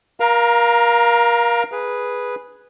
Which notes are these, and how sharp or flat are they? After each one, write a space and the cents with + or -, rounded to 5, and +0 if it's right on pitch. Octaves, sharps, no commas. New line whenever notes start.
A#4 +30 F5 +0 A#5 +0
G#4 +0 B4 -5